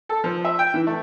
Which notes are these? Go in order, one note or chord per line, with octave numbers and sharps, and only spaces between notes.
A4
F3
E5
G5
E3
A3